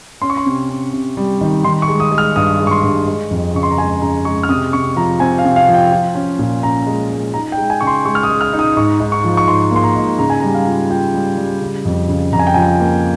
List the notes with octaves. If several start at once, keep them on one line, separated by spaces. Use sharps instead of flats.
C#4 C6
C#6
C6
C3
C#4
C3
G3
D#3
D#3 C6
C#6
G#3
D#6
G#3
F6
G2 D#6
G#3
C#6
C6
G2
G#3
F2
C#3 C#6
C6
A#5
G#3 G#5
C#3 A#5
G#3 C#6
F6
C3 D#6
C3 C#6
F3 A#5
C4 G#5
F5
C3
F5
F3
G5
F4
C#4
A#2
C#4 A#5
G#3
G#3
D#4 A#5
G5
G#3
G#5
C#3 C#6
C6
G#3 C#6
F6
D#6
G#3
F6
D#4
D#6
G#2 C#6
G#2
C#6
F3
C#6
G#2 C6
A#3 C6
A#5
G#2
C#3 A#5
G#5
G3 A#5
F5
F4
F4 G5
G3
G3
C#3
F2
C#3
F2 A#5
G#5
G5
F3 G#5
A#3